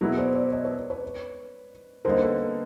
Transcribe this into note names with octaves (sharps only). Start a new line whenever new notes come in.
B2 F#3 B3 E4 G#4 A#4
C5 D5
C5 D5
C#5 D#5
B4 C#5
B4 C#5
D3 G3 A#3 D#4 A#4 C5
A4 B4